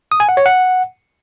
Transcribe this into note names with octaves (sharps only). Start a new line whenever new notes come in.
D#6
G#5
F#5
C#5
F#5